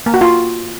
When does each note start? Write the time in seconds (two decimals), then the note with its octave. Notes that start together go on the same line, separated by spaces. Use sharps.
0.06 A#3
0.14 F#4
0.21 F4